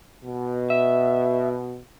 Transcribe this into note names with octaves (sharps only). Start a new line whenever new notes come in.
B2
E5